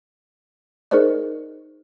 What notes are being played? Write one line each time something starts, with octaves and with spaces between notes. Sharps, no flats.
D#4 G#4 A#4 C5 D5 D#5